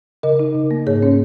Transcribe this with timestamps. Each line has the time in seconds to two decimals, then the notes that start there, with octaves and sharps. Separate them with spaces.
0.23 C#3 A#4 D#5
0.39 D#4
0.55 C#3
0.71 A#3
0.87 G#2 G#4 C#5
1.03 C#4